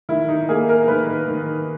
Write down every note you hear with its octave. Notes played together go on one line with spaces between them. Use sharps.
D#3 E4
D#4
A#3 G#4
A#4
D#3 B4
D#3